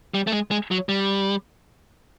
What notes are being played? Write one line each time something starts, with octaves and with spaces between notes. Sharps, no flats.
G3
A3
G#3
G#3
F#3
G3